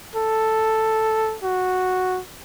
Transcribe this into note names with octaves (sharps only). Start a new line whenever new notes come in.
A4
F#4